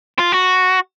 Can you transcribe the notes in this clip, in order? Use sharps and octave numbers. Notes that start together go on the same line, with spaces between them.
F4
F#4